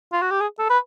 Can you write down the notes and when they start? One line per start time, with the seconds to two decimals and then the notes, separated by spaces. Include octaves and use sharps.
0.12 F4
0.22 F#4
0.31 G4
0.41 G#4
0.59 A4
0.69 B4